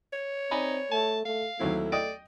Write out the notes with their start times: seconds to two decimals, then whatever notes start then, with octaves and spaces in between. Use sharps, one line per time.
0.13 C#5
0.51 C4 D#4 D5 G#5 B5
0.92 A3 A5
1.25 A3 F5
1.60 D#2 F#3 A3 C4 E4
1.92 D5 D#5 G5 D#6